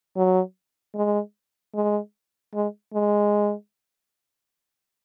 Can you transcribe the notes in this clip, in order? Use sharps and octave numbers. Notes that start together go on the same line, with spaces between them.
F#3
G#3
G#3
G#3
G#3